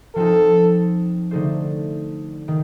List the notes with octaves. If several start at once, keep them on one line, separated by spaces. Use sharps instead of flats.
F3 C4 D#4 A4
D3 A3 D#4 A4 C5
D#3